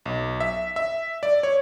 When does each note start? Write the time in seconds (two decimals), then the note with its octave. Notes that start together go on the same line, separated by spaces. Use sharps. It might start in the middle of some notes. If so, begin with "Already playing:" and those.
0.06 B1
0.40 E5
0.76 E5
1.23 D5
1.43 C#5